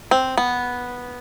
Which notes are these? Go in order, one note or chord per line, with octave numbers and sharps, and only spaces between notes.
C4
B3